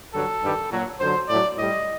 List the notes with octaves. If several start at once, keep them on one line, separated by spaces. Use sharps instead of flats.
G2 D3 F#3 A4
G2 D#3 G3
A#2 F#3
F#2 D3 F#3 C5
A2 F#3 D5
A2 G3 D#5